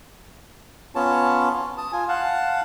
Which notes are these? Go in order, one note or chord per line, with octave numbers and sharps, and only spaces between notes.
B3 C#4 F4 C#5 A5
A5 D#6
F4 G#5
F5 F#5 A5